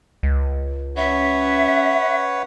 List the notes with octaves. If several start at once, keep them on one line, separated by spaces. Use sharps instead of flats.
C#2
C#4 B4 C#5 E5 F#5